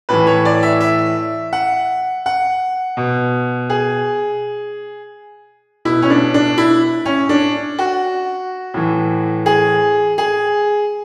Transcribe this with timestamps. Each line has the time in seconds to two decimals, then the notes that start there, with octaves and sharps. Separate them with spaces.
0.09 A2 E3 B4
0.27 C#5
0.45 D5
0.63 E5
0.81 E5
1.53 F#5
2.26 F#5
2.97 B2
3.70 G#4
5.85 B2 E4
6.02 C#4
6.10 D4
6.34 D4
6.58 E4
7.06 C#4
7.29 D4
7.79 F#4
8.74 A2 E3
9.46 G#4
10.18 G#4